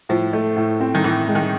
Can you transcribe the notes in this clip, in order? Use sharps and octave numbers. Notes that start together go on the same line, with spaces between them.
A2 F3
A3
A2
C4
D#3
A2 E3
G#3
D#3